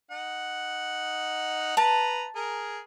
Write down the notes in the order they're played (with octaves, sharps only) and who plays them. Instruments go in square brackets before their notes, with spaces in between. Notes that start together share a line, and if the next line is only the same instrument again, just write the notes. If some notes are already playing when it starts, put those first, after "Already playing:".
[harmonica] D#4 F#5
[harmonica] B4 A#5 [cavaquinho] A5
[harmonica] G#4 A#4